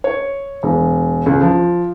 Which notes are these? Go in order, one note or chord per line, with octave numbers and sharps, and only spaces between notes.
C#5
E1
C#2
F3